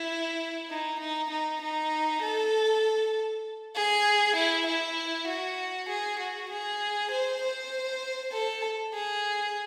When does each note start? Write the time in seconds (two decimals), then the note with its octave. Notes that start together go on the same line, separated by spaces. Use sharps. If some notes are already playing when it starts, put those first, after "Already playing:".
Already playing: E4
0.70 D#4
1.00 D#4
1.31 D#4
1.62 D#4
2.22 A4
3.76 G#4
4.36 E4
4.67 E4
5.28 F#4
5.89 G#4
6.20 F#4
6.50 G#4
7.11 C5
7.42 C5
8.33 A4
8.94 G#4